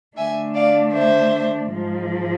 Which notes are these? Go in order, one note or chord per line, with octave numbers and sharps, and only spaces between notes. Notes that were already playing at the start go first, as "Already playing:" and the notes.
D3 A3 D4 E5 G#5
D5 F5
C5 E5
G#2 F3 G#3